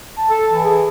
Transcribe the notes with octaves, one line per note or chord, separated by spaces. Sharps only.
A5
A4
E3
G#4